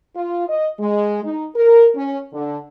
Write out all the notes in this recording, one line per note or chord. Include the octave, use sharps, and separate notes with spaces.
F4
D#5
G#3
D#4
A#4
C#4
D3